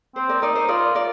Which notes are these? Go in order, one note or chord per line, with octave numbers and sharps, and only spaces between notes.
C4 C5
A#4 D5
D#4 A#4 D5
C5
F4 A#4 D5
A#4 D5